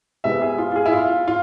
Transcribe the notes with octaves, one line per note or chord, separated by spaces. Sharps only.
C3 G#3 B3 E5
G#4
F4
F4
G#4
E4
F4
F4